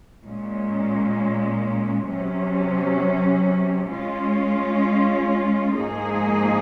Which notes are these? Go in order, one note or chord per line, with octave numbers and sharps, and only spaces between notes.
A#2 G#3 C#4
C3 F#3 C#4
G#3 C#4 F4
G#2 F3 A#3 D#4 G#4